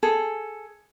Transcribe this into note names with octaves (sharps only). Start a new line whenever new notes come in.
G#4 A4